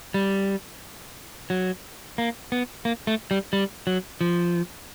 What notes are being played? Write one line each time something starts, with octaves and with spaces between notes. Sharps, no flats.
G3
F#3
A#3
B3
A#3
A3
G3
G3
F#3
F3